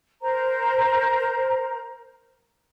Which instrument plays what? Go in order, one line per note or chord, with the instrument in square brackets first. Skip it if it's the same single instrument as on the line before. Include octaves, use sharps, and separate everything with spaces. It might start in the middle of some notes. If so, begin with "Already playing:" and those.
[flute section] A#4 C5 A#5